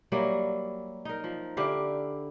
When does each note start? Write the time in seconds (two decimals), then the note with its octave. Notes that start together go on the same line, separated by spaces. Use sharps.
0.12 F#3 G3 A#3 E4
1.05 D#4 A#4
1.24 F3
1.57 D3 E4 G4 F5